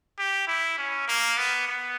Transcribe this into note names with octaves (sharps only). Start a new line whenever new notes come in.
G4
E4
C#4
A#3
B3
B3